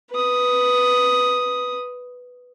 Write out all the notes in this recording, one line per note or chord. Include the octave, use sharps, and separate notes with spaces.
B4 D#6